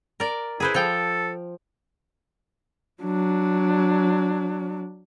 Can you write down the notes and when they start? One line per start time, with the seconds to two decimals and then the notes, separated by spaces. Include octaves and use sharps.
0.20 A#4 D5
0.60 E4 G#4 B4 C5
0.74 F3 A4 G5
3.03 F#3 D4